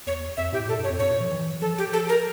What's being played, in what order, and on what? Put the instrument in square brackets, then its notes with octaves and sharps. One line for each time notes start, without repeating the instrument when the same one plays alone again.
[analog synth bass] E2 [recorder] C#5
[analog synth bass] F2 [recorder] E5
[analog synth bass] A2 [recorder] G4
[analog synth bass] A#2 [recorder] A4
[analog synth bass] G2
[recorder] C#5
[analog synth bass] F2
[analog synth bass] G2 [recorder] C#5
[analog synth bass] A#2
F3
E3
[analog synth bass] F3 [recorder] A4
[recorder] G4
A4
A#4